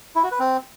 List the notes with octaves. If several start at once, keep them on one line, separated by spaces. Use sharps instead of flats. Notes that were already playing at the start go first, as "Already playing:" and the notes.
E4
F#4
B4
C4